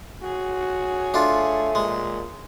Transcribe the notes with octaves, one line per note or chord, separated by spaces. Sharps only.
F#4 G#4 C#5
A3 D4 F4
A#2 G#3